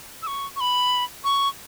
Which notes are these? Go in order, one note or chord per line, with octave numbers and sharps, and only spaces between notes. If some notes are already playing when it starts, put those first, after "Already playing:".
E6
C#6
C#6
B5
C#6